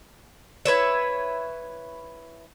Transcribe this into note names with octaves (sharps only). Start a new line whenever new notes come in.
E4 B4 C#5 E5